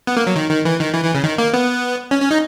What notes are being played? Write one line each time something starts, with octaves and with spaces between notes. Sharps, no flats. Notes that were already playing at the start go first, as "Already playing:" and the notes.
B3
A#3
F#3
D#3
D#3
E3
D#3
E3
E3
C#3
D#3
A#3
B3
C#4
C#4
D#4